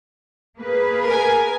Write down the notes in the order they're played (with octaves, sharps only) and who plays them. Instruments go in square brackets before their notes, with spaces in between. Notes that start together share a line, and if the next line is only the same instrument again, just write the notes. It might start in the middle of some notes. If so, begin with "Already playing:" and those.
[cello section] A#3 G#4 B4
[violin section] A#4 G#5